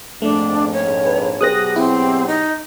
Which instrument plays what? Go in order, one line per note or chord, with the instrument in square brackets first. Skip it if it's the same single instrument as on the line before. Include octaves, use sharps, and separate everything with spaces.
[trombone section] A#1 F2 G#2 [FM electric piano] A3 [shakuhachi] D4
[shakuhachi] C#5
[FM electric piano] B4
[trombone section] B2 F#3 G4 [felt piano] G#4 C5 [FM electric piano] D#6 F#6 A#6
[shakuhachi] C4 [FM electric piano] E4
[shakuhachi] D#4